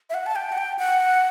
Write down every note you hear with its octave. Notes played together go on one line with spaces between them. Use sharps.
E5
F#5
A5
G5
F#5
G5
F#5